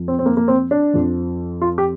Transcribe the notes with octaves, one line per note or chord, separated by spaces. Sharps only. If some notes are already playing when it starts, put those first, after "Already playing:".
Already playing: F2 F3
C4
C4
A#3
A#3
C4
D4
F2 F3
F4
G4